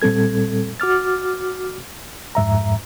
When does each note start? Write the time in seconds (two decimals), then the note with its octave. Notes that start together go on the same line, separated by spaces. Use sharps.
0.02 A#2 G3 C4 A4 G#6
0.80 F#4 D6 F6 A6
2.35 F2 G#2 E5 A#5